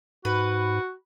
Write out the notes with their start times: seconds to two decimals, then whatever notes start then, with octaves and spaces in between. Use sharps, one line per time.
0.25 G#2 F#4 B4